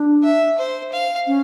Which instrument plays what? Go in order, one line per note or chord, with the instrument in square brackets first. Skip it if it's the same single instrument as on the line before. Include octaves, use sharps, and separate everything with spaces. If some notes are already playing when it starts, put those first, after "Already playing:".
Already playing: [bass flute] D4
[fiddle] E5
C5
F5
[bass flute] C#4